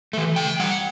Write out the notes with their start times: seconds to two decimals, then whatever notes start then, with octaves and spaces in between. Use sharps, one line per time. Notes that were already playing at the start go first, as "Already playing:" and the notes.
0.13 E3 A3
0.36 C#3 G5
0.60 G3 F#5